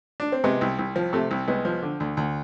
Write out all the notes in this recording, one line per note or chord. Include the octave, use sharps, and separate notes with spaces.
D4
C4
C3 G#3 B3
C2
C2
F3
C3 A3
C2
C2 G#3 B3
F3
D3
D2
D2